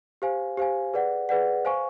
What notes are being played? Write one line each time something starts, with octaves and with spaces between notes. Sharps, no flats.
G4 C5 F5 G#5
G4 C5 F5 G#5
G#4 B4 D5 F#5
G#4 B4 D5 F#5
C5 F5 G#5 C#6